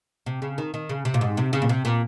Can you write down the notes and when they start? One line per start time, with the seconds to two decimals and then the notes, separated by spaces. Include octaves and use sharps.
0.26 C3
0.42 C#3
0.58 D#3
0.74 D#3
0.89 C#3
1.05 C3
1.14 A#2
1.21 G#2
1.37 C3
1.53 C#3
1.62 A#2
1.69 C3
1.85 A#2